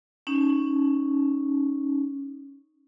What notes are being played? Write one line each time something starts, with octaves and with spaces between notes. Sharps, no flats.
C#4 D#4